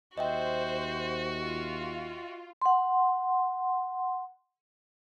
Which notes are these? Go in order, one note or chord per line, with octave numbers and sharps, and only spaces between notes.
D#2 F#4 C5 D#5 E5 G5
F4
F#5 C6